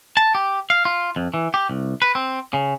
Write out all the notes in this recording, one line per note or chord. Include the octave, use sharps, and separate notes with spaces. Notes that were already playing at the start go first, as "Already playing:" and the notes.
A5
G4
F5
F4
F2
E3
G4
C2
B4
C4
C#3